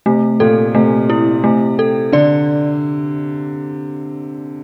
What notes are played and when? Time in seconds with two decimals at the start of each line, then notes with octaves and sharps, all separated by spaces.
0.06 C3 A3
0.40 A#2 A4
0.75 C3 A3
1.10 E4
1.44 C3 A3
1.79 A4
2.12 D3 D5